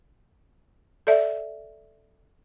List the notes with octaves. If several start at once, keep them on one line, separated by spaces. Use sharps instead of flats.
A4 D5 E5